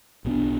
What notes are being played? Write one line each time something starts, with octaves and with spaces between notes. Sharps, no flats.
B1 B2 B3 D4